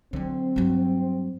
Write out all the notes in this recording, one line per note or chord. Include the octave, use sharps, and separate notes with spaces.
D3 F#3 C4
G2 F#3